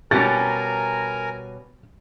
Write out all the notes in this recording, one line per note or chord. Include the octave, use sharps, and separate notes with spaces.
B2 G3 C#4 A#4 G#5 A#5 A6